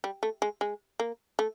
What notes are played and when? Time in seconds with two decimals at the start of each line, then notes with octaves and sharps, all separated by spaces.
0.04 G3
0.23 A3
0.42 G#3
0.61 G#3
1.00 A#3
1.39 A3